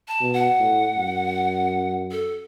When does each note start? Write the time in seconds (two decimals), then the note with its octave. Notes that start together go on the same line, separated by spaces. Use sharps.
0.08 A5
0.21 B2
0.34 F#5
0.60 A2
0.97 F#2
2.11 A4